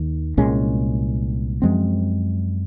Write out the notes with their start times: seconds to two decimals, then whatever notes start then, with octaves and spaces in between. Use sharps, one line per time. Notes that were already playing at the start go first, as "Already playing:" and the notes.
Already playing: D#2 D#3
0.37 C2 A#2 G#3 C#4
1.62 F#2 F3 G#3 C4